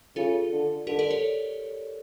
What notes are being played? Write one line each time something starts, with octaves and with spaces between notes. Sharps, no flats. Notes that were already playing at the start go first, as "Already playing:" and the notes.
C#3 F4 A4
D3
D3 G4 A#4
A#4 D5
A4 C#5